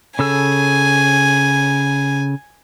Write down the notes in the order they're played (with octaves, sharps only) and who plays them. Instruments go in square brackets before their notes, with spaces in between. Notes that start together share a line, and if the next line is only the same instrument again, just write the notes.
[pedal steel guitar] C#3 A4 E6 [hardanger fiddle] G#5